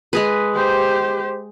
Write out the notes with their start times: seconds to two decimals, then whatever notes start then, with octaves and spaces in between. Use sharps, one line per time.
0.13 G#3 G#4 B4
0.55 G4 C5